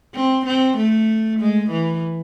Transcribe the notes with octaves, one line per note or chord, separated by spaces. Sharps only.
C4
C4
A3
G#3
E3